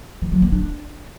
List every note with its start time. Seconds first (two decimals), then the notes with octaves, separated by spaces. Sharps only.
0.22 E3
0.32 F#3
0.42 A#3
0.52 D4